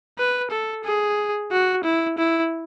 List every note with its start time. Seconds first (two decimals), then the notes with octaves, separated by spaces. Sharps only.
0.18 B4
0.51 A4
0.84 G#4
1.52 F#4
1.84 E4
2.18 E4